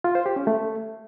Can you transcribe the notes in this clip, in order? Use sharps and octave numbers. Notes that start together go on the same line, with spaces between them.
F4
C5
G4
C#4
A3